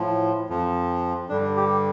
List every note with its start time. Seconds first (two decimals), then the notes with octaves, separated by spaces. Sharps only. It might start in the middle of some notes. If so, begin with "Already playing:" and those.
Already playing: A2 F3
0.49 F2 F3
1.29 G2 D3 G3 D4
1.57 G4